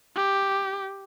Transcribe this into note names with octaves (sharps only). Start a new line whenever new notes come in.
G4